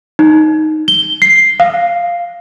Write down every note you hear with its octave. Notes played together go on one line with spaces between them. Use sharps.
D#4
G7
C7
F5